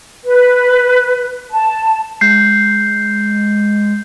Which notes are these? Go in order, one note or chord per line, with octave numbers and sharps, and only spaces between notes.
B4
A5
G#3 G6 C7